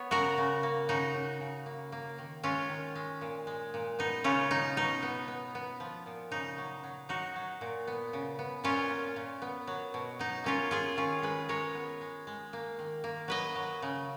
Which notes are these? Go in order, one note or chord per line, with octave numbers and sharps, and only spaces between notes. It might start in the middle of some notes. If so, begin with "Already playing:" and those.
Already playing: B3 C#5
C#3 F#4 A#4
C#3
A#3
C#3 D#4 F#4
C#3
C#3
A#3
A#3
D#3
G#3 C#4 F4
D#3
G#3
A#2
G#3
A#2
B3 D#4
C#3 C#4 F4
C#3 D#4
B2 D#4
B3
B3
B3
F3
A#2
C#3 D#4
F#3
F#3
F#3 D#4 F#4
F#3
A#2
B3
C#3
B3
A#2 C#4 F4
A#2
A#2
B3
F#3
B2
F#3 D#4
A#3 C#4 F4
A#3 F4 G#4
D#3 C#4 F4
G#3 G#4 B4
G#3 A#4 C#5
B3
G#3
G#3
A#3
D#3
A#3
F#3 B4 D#5
F#3
C#3